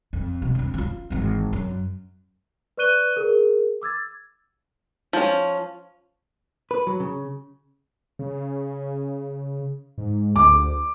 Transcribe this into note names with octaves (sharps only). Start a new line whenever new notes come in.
F2
B2
F2 D3
C#4 F4
G#1 E3
F#2
B4 D5 C#6 F#6 D#7 G7
G#4 A#4
D6 E6 G#6 A6
F3 C#4
B4
F#3
C#3
C#3
G#2
D2 D6